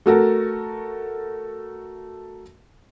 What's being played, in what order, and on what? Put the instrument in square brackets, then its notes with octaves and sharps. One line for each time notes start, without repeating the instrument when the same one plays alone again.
[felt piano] A3 F#4 A4 A#4